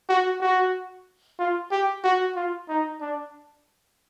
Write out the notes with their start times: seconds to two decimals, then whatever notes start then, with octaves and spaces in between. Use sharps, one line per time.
0.09 F#4
0.41 F#4
1.39 F4
1.71 G4
2.04 F#4
2.35 F4
2.69 D#4
3.00 D4